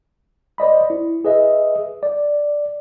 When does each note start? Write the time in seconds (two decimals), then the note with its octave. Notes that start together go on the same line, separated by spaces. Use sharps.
0.58 C5 D5 D#5 B5
0.90 E4
1.25 G#4 B4 D#5 E5
2.03 D5